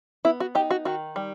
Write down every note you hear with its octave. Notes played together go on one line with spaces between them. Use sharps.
B3 E4
F#4
D#4 G4
F#4
D#3 F#4
G3